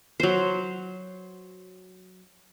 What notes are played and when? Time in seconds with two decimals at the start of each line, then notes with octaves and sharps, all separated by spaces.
0.20 F#3 C5